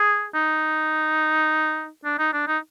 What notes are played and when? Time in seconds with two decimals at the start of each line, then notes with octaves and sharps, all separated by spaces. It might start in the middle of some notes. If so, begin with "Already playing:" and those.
Already playing: G#4
0.35 D#4
2.05 D4
2.19 D#4
2.33 D4
2.48 D#4